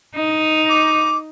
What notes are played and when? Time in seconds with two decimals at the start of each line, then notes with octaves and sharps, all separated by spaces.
0.16 D#4
0.69 D6